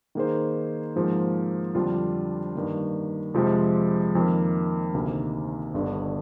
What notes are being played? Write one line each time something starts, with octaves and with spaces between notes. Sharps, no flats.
D#3 A#3 D#4 G#4 C5
G#2 F3 A#3
F2 D3 G3 D4 F4
G2 D#3 A#3
F2 C3 F3 G#3
F2 D#3 A#3
D2 C3 D#3 A#3
G1 G2 D3